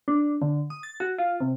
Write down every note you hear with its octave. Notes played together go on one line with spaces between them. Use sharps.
D4
D3
D#6
A6
F#4
F4
C3